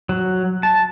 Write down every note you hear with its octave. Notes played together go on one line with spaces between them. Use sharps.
F#3
A5